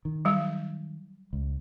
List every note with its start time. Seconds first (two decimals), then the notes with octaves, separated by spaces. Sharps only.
0.05 D#3
0.25 F#3 G3
1.33 C#2